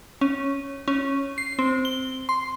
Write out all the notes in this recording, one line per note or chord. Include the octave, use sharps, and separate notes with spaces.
C#4
C#4
C7
C4
G7
C6